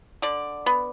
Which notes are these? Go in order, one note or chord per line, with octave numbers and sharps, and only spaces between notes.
D3 D5
B3